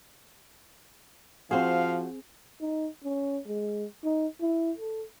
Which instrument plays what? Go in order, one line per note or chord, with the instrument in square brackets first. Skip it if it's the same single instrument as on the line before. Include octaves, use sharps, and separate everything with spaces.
[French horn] F3 [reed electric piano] C4 G#4 [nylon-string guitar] F#4 C5 [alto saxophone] F5
[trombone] D#4
C#4
G#3
D#4
E4
A4